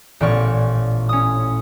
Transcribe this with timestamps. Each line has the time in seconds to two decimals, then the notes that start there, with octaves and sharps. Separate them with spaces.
0.20 A1 A#2 B3 D5 C#6 F6
1.09 C#4 D#6